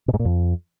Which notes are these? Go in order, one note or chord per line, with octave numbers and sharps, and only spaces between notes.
B2
G#2
A#2
F2